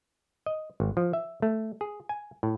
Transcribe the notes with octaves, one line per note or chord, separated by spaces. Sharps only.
D#5
G#1
F3
E5
A3
G#4
G#5
A2